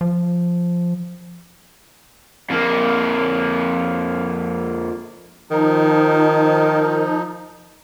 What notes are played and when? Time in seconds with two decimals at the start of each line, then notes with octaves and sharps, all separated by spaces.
0.01 F3
2.50 F2 A#3
5.51 D#3 F3 D#4